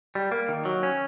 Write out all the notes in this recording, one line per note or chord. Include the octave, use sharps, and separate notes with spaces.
G3
A#3
D#3
F#3
C#4